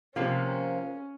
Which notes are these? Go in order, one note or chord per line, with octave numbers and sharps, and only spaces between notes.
C3 F3 A#3 C#4